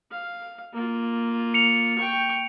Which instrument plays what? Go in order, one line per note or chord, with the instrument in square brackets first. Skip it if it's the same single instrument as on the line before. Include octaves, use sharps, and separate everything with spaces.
[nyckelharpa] F5
A#3 F4
[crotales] C#7 F7
[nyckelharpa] G5 C#6